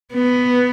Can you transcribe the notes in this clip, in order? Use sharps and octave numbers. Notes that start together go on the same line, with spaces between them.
B3